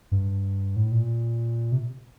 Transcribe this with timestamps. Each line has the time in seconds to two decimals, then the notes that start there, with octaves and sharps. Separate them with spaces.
0.12 G2
0.76 A2
0.92 A#2
1.72 C3